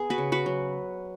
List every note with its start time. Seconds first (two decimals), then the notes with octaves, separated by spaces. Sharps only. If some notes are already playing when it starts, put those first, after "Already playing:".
Already playing: B3 G#4
0.10 F#4 B4
0.18 C#3
0.32 F#4 B4
0.46 F#3